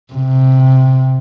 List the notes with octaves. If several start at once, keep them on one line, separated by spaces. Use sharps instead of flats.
C3